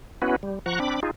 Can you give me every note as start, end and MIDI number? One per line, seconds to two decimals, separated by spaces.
0.22 0.36 59
0.22 0.36 61
0.22 0.36 64
0.22 0.36 66
0.22 0.36 71
0.43 0.59 55
0.66 0.79 53
0.66 0.79 78
0.66 0.79 82
0.66 0.79 85
0.66 0.79 90
0.80 1.00 60
0.80 1.00 62
0.80 1.00 83
0.80 1.00 86
1.03 1.11 63
1.03 1.11 65
1.03 1.11 68